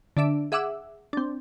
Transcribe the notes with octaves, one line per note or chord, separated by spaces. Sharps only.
D3 D4 E5 D7
G#4 E5 F#5 D6 E6
C4 D4